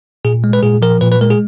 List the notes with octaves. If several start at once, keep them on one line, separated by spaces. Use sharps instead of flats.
A#2 G#4
G#3
B4
A#2 G#4
F3 A#4
A#2 B4
B4
G#3 A#4
G#4